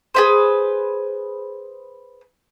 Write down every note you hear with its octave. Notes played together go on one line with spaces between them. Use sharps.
G#4 B4 C5